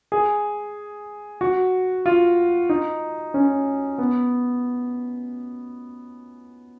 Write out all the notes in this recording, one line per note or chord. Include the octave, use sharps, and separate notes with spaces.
G#4
F#4
F4
D#4
C#4
B3